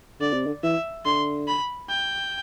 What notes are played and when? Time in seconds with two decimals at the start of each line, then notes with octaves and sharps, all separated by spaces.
0.20 D3 D5
0.33 C3
0.46 D3
0.63 E3 E5
1.05 D3 C6
1.47 B5
1.89 G5